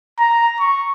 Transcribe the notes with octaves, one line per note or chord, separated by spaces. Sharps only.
A#5
C#6